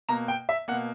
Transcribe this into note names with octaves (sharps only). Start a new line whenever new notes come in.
B2 A#3 A#5
G5
E5
B2 A#3 F#5